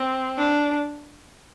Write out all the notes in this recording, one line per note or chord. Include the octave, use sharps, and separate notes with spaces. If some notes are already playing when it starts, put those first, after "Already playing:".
Already playing: C4
D4